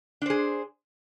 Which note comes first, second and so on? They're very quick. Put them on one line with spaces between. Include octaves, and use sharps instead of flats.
D4 C5 G#4